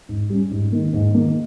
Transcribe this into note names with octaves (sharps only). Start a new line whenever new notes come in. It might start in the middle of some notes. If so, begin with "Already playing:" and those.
G#2
G3 C#4
G#2
D#3 A#3
G#2
D#3 A#3